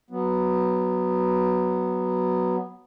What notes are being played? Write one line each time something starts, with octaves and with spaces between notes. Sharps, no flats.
F#3 B3